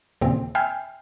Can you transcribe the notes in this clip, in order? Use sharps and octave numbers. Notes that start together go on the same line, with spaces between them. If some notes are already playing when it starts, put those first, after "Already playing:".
D#2 A#2 C#3 E3 C4
E5 G5 G#5 B5 F6 C7